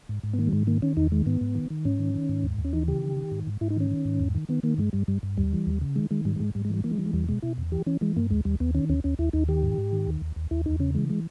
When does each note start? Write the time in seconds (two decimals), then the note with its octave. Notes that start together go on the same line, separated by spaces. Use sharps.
0.09 G#2
0.23 G#2
0.34 B3
0.38 D#3 A#3
0.47 G3
0.53 G#2 G#3
0.67 D#3 A#3
0.82 D#3 C#4
0.97 E2 D#4
1.12 D#3 G#3
1.26 G#2 B3
1.41 G#2
1.55 D#3
1.70 D#3
1.85 G#2 C#4
1.99 D#3
2.14 D#3
2.29 G#2
2.44 D#2
2.58 D#2
2.65 C#4
2.73 E3 D#4
2.88 C#3 G4
3.02 D#3
3.17 D#3
3.31 G#2
3.47 G#2
3.61 G#2 E4
3.70 D#4
3.76 D#3 C#4
3.91 D#3
4.05 G#2
4.20 E2
4.35 D#3
4.49 D#3 B3
4.63 D#3 A#3
4.78 G2 G#3
4.93 G2 G3
5.08 G2 G3
5.23 G2
5.37 D#2 G3
5.53 E3
5.67 D#2
5.81 C#3
5.96 D#3 G#3
6.11 D#3 G#3
6.25 G#2 G3
6.36 G3
6.40 G#2 G#3
6.55 G#2 G3
6.65 G#3
6.69 E3 G3
6.84 E3 A#3
6.92 G#3
6.98 E3 G3
7.06 G#3
7.13 E2 G3
7.28 B2 G#3
7.42 B2 E4
7.58 E2
7.72 E3 G4
7.86 E3 C#4
8.01 E3 G#3
8.16 G2 A#3
8.30 D#2 G#3
8.45 D#2 G3
8.60 D#2 B3
8.75 D#3 C#4
8.89 D#2 C#4
9.04 D#2 C#4
9.19 D#2 E4
9.33 D#2 D#4
9.48 D#3 G4
9.63 G#2
9.78 G#2
9.92 D#3
10.07 D#2
10.21 D#2
10.36 D#2
10.51 D#2 E4
10.66 E2 D#4
10.80 C#3 C#4
10.95 E3 G#3
11.10 G#3